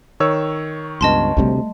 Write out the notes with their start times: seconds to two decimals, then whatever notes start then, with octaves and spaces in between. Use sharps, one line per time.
0.20 D#3 C#5 E6
1.01 C#2 G2 B3 D#5 A5 C6
1.37 D2 C3 G3 A3